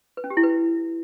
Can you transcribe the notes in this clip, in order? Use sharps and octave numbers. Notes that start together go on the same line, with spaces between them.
B4
C#4
G4
E4
B4